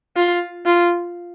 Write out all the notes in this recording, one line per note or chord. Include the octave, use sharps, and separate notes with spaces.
F4
F4